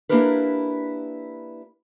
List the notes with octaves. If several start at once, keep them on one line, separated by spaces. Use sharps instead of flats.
A#3 D4 E4 G4 A#4 B4